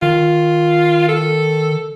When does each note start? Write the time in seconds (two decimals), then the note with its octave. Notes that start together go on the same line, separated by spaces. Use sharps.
0.02 D#3 F4
1.09 A4